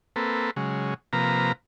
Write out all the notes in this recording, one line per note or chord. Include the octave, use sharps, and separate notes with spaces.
A#3 C4 A4 B4
C#3 F#3 G#3
C3 F3 A#3 B4 A#5